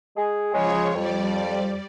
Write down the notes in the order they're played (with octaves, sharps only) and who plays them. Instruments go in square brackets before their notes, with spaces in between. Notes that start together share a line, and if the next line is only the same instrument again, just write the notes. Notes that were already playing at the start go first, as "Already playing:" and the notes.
[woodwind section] G#3 G#4
[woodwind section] C#3 G#3 [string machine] F3 C#5
[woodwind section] F2 [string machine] G3 D5